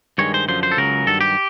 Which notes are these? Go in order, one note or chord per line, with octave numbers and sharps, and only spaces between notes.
G2 D#3 G#3 C#5
C5
F#2 D3 F3 C5
C5
A4
C#2 C#3 F#3 A#4
G2 D#3 F#3 A4
G4